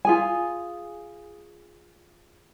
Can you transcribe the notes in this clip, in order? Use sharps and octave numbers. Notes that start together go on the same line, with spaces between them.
F4 G#4 G#5